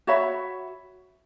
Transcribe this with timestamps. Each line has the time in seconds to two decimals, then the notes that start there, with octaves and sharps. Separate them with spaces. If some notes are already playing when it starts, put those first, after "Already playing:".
0.07 F#4 C#5 E5 B5